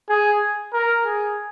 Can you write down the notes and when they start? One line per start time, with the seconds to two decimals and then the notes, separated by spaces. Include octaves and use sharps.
0.09 G#4
0.73 A#4
1.05 G#4